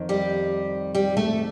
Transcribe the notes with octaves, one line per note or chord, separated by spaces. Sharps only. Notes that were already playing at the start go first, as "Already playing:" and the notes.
Already playing: F2 D#3
G3 G4
G3 G4
A3 A4